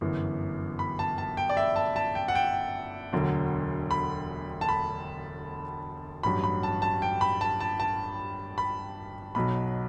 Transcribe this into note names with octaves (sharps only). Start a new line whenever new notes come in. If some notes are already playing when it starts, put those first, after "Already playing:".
G1 F#2 E3
B5
A5
A5
G5
D5
E5
A5
A5
G5
F#5
G5
E1 D2 D3 F#3
B5
A5
B5
A1 G2 F#3 B5
B5
A5
A5
G5
B5
A5
A5
A5
B5
B1 B2 F#3 B5